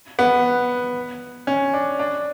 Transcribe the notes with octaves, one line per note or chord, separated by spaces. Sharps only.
B3
C#4
D4
D4